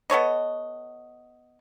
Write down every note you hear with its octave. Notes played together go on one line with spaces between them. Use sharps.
B3 A4 C#5 D#5